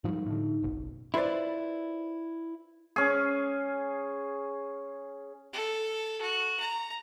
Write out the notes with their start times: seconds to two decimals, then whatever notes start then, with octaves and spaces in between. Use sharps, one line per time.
0.04 G#2 F3 G3 D#4
0.26 A2 D3
0.63 F#1 B1
1.14 E4 F4 B4 C5 D5
2.96 C#4 G#4
5.53 A4
6.21 F#4
6.60 A#5